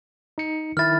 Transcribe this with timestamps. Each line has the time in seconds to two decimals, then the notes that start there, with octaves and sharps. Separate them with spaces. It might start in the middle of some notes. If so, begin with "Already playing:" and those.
0.38 D#4 C#7
0.77 D#3 E4 F6 A6